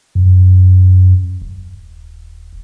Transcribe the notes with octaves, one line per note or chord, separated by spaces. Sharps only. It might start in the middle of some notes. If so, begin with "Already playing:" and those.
F#2
D#1